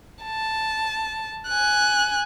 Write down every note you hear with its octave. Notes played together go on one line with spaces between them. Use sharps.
A5
G#5 F#6